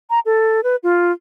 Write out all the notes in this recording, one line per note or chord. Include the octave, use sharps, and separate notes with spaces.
A#5
A4
B4
F4